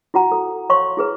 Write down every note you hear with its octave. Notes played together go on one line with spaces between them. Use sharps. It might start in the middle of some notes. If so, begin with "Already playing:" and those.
E4 F#4 F#5 A#5
A4
C#5 F5 C6 C#6
E4 G#4 B4